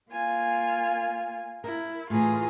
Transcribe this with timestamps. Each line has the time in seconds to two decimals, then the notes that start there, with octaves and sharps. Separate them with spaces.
0.12 A#3 F4 G#5
1.64 E4 A#4
2.10 A2 E3 F4 G#4 A#5